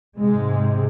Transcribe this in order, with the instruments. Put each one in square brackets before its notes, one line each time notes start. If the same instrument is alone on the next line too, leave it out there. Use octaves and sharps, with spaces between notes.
[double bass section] G#2 C3 G#3